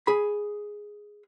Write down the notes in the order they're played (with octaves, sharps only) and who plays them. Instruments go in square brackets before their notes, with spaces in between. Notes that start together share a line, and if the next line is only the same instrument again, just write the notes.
[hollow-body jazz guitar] G#4 B5